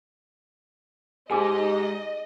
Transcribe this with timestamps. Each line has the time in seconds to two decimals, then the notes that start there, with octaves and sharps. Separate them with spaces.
1.31 G#2 D#4 G4 G#4 D#5 G#5